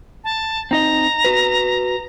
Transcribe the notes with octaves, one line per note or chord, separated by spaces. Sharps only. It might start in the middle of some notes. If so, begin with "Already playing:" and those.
A5
C4 D#4 D#5 A#5
F#4 B4